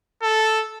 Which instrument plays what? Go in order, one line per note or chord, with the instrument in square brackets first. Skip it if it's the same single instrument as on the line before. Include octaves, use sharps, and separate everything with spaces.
[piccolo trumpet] A4